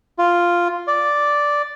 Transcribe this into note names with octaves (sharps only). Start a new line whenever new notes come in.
F4
D5